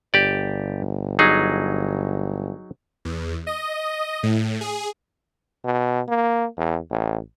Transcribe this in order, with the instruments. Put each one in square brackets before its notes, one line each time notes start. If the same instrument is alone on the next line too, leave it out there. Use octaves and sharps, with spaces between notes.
[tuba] G1 [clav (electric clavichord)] G4 D5
[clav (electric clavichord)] F#3 D#4 G#4
[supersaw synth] E2
D#5
A2
G#4
[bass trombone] B2
A#3
E2
A1